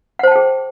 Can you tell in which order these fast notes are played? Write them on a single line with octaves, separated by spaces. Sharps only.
F#5 C5 A5 G5 G#4